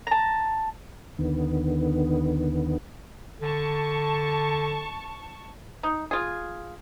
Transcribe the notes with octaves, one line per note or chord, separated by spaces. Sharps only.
A5 A#5
D#2 D3 D#3 B3
D3 A5 C#6
D#4
F4 G#4